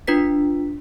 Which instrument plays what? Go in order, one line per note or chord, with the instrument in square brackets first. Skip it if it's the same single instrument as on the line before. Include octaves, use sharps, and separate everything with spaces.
[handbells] D4 F4 B4 B6